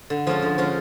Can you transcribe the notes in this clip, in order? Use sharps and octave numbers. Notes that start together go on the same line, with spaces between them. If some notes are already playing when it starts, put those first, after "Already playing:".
D3
F3 G#3 C#4 F4
D3
F3 G#3 C#4 F4